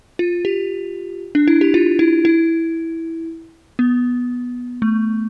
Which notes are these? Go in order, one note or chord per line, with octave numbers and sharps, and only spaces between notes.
F4
G4
D4
E4
G4
F4
E4
E4
B3
A3